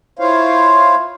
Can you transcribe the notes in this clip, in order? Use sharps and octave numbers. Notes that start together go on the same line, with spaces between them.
E4 F4 C5 C#5 F5